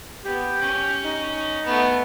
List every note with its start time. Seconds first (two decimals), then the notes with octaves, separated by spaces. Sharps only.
0.25 B3 G4
0.60 C#4
1.05 D#4
1.65 A3 B3